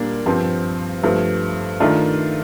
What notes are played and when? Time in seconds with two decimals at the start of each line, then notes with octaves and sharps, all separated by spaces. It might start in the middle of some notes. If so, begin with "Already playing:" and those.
Already playing: A#2 G3 A#3 D4
0.26 G2 F3 C4
1.03 G2 F3 A3
1.80 D#3 A3 D4 F4